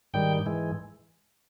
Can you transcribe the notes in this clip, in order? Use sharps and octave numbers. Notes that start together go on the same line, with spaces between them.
G#2 D#3 G3 G5
G#2 E3 G#3